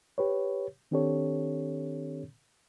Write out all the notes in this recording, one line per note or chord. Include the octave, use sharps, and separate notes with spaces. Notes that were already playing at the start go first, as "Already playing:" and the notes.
G4 B4 C#5
D#3 C4 D4 G4 A4 C#5